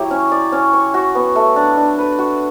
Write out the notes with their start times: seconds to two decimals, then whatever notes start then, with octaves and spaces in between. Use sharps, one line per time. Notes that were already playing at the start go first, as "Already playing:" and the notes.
Already playing: F#3 E4 G4
0.11 C#4
0.32 D5
0.52 C#4
0.74 C#5
0.94 F#4
1.15 B3
1.36 A3
1.56 D4
1.77 D4
1.98 B4
2.19 F#4